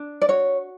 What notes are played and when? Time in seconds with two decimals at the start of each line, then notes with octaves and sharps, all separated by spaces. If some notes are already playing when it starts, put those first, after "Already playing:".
Already playing: D4
0.21 D5
0.28 F#4 C#5